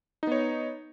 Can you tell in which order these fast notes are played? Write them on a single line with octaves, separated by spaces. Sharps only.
D#4 B3 C#5